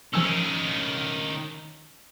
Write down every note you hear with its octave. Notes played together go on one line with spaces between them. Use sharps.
D#3 F3 C#4 G#5 E6